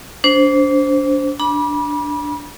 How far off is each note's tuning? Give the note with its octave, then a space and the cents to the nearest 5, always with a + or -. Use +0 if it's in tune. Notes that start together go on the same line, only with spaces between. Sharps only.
D4 -30 C5 +0
D4 +0 B5 -35